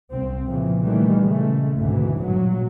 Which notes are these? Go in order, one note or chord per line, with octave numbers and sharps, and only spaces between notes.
C2 C4
A#2 C#3 E3 F3
A#2 D#3 E3 G3 A3
C#3 G#3 A3
G#1 D2 B2 E3
G2 A#2 F#3